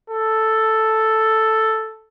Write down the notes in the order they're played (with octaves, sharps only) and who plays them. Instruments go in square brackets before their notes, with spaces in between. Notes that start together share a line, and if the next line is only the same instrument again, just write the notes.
[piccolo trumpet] A4